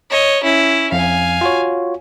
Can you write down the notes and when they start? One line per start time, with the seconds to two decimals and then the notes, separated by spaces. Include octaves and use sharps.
0.10 C#5 D#5
0.44 C#4 E4
0.92 F2 F5 G#5
1.41 F4 F#4 C#5